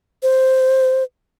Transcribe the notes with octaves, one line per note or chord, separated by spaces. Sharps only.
C5